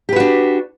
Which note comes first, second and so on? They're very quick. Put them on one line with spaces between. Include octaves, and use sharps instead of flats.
G4 B4 F#4 D4